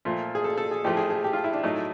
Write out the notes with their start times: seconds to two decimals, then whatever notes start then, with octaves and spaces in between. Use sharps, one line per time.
0.05 A#2 F3 A3
0.35 G#4
0.44 A4
0.58 A4
0.71 G#4
0.84 A2 F3 A3 G4
0.97 G#4
1.10 G#4
1.24 G4
1.33 F4
1.44 E4
1.53 D4
1.63 A2 F#3 A3 D#4